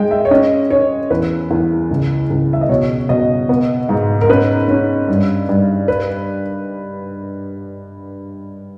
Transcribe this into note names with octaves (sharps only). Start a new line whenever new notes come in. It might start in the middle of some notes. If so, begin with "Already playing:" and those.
Already playing: G#3 G5
E5
C#5
C#4 D#5
C#4 C#5
E2 B4
E2
C#2
C#2
E5
D#5
B2 C#5
B2 D#5
B3
G#2
A#4
C#4 B4
C#4
G2
G2
B4